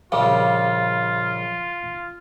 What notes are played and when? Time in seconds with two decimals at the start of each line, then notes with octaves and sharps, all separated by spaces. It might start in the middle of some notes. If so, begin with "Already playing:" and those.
0.12 A#1 C#3 G3 F4 F5 D6